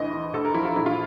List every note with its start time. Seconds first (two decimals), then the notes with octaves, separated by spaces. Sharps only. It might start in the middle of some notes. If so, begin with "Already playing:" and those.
Already playing: D2 E3 D#5
0.13 E3
0.33 D2 A4
0.45 A#4
0.54 F3 E4
0.65 F4
0.76 A#1 E4
0.86 F4